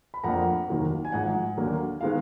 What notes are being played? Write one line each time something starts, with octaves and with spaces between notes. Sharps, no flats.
B5
F2 F3 A#3 D4 F#5 A#5
F1 D#2 D#3 F#3 A#3
G#5
G#1 G#2 F3 F#5
D#2 D3 F#3 A#3
D#3 G#3 B3 F5